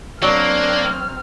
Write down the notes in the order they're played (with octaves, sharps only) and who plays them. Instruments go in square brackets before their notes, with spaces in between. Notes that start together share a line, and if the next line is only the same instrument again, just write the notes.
[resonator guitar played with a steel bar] F#3 [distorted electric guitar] A#3 [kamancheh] C4 F6 [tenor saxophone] D4